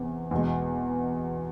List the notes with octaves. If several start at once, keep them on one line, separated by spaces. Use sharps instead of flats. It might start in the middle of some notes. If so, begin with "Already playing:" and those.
Already playing: E2 C3
E2 B2 G#3